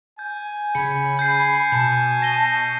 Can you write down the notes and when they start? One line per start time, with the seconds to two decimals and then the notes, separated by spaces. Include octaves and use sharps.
0.19 G#5 G6
0.75 C#3 B5 C#7
1.19 G6 C7
1.72 B2 A5
2.22 A#6 D#7 G7